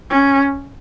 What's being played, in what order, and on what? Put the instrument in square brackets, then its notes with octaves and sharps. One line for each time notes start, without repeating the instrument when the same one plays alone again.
[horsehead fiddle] C#4